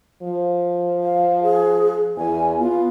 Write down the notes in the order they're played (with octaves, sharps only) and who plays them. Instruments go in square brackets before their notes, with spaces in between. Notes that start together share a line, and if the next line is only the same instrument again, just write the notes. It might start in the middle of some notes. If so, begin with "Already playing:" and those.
[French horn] F3
[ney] F5
G#4
[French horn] E2 [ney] G#5
[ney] B3 [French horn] F4